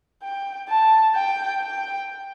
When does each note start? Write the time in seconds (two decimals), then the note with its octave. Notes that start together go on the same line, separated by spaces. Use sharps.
0.23 G5
0.69 A5
1.15 G5
1.61 G5